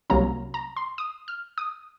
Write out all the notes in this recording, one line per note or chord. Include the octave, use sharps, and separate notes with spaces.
C2 C3 F#3 A#3 C#4 A#5
A#5
C6
D#6
F6
D#6